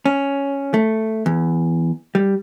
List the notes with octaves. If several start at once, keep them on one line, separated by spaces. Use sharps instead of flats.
C#4
A3
E2
G3